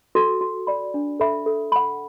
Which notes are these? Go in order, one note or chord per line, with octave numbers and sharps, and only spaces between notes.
F#4 A4
F#4
D5 B5
D4
A4 E5 B5
A4
F#5 B5